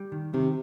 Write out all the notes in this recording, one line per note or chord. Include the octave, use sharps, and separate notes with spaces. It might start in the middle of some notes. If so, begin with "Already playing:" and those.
Already playing: G3
D#3
C3 D#3